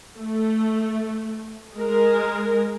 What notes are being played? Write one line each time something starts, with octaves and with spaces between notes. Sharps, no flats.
A3
G#3 A#4